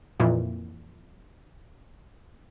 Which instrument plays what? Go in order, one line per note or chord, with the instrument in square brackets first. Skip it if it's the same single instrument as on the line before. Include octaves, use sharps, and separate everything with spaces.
[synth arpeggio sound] F2 A#2 E3